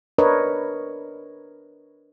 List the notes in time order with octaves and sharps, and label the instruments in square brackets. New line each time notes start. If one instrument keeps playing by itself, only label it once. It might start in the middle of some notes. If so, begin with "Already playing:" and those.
[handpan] D4 A#4 B4 C#5 D#5